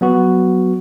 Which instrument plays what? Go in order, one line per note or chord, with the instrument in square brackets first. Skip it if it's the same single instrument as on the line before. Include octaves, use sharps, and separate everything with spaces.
[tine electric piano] F#3 B3 F#4